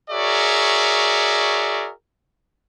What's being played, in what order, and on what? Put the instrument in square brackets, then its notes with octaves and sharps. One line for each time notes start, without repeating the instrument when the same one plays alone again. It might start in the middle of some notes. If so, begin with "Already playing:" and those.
[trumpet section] F#4 G#4 A#4 C#5 D5 E5